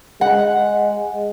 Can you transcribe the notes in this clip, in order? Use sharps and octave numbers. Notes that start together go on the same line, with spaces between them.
G#3 F#5